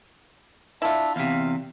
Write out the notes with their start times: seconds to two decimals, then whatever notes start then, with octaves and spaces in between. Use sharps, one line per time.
0.82 D4 E4 F4 E5
1.16 E2 C3 F5